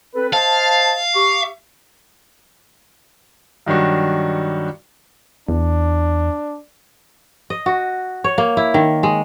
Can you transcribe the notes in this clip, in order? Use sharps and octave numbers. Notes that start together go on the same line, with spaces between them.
C4 A4 B4
C5 D#5 F5 A5
G4 C#6
G2 D#3 F#3 D4 F#4
E2 D4
D#5
F#4
C#5
A#3
E4
D#3
G#3